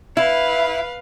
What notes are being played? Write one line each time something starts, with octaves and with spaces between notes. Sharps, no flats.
E4 B4 F5